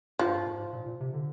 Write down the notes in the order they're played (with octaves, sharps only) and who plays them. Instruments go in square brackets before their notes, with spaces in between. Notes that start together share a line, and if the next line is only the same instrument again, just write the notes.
[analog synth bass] G2 [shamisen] F3
[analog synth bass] G#2
A#2
A#2
C3
D3